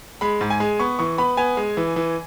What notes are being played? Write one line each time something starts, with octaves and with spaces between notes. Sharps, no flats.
G#3 B5
G#2
G#5
G#3
B3 C#6
E3 C#6
B3 B5
B3 G#5
G#3
E3
E3